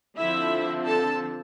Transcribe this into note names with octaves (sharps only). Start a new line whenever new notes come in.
D3 F3 C4 E4 E5
A4 A5